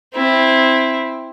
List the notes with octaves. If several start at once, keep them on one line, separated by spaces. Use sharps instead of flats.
C4 E4